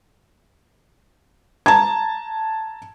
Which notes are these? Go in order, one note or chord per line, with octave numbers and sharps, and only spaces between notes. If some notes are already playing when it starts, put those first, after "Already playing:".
A5 A#5 G#6